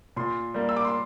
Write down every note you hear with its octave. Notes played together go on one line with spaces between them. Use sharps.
A#2 C6
G3 A#3
E6
D6
C6